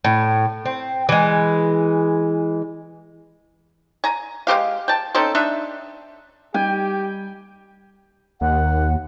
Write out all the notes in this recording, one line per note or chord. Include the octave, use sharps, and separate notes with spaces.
A2
C4
E3 G#3
G#5 A#5
G#3 C4 G4 F5
G5 A5
C4 C#4 D#4 A4
D4 D#4 E5
G3 D#4 G4 G5 G#5
D#2 F#5